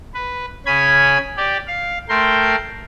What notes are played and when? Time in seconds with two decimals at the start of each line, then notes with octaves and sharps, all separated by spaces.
0.14 B4
0.66 C#3 C#4 G#5 B5 G#6
1.37 G4 D5
1.67 F5
2.09 A3 A#4 G5 C6